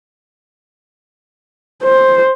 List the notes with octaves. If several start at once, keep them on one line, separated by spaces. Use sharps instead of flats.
C5